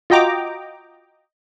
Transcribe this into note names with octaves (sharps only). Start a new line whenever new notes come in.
F4 F#4 D#5 G5 A#5 D6